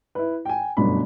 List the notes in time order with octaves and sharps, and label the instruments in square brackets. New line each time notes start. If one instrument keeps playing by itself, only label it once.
[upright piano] E4 B4
G5 G#5
G1 F#2 B2 A3 D4 B5